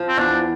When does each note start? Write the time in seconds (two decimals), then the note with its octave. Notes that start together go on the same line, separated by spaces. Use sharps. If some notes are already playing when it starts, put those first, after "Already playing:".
Already playing: F3
0.09 C4
0.17 E2 D4